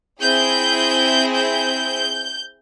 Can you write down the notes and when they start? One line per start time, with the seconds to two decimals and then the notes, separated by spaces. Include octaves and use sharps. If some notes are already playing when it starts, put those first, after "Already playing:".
0.20 C4 E4 G#4 G6
1.35 G6